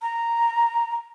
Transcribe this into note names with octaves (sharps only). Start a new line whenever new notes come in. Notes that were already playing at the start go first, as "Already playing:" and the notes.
A#5